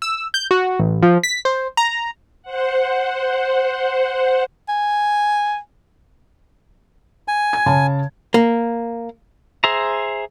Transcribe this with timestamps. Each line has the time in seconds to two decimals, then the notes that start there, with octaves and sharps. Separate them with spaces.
0.02 E6
0.34 G6
0.51 F#4
0.79 A1
1.03 F3
1.23 B6
1.45 C5
1.77 A#5
2.43 C5 F#5
4.69 G#5
7.28 G#5
7.53 G#6
7.66 C#3 A5
8.34 A#3
9.64 G#4 C5 E5 A#5